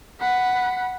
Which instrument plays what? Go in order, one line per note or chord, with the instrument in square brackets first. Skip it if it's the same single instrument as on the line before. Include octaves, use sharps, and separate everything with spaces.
[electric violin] F#5 B5